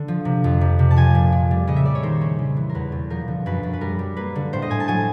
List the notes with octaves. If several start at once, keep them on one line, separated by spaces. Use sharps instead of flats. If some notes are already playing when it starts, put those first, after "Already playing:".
Already playing: D3
F3
C3
F2
C3
C3
A5
F3 G#5
A#2
A#2
G3
C#3 D#5
E5
G3 D5
C#5
D#3 C5
C#4
C#3
E3
A#4
E2 B4
B2
F3 A#4
D3
F#2 B4
F#2
B4
G3 A#4
G3
A#3 B4
D3
A2 C5
D#5
A2 G#5
A5
F#3 G#5